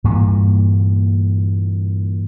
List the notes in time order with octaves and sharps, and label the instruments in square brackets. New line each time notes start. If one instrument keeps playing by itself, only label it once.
[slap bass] G2 A#2 E3 A#3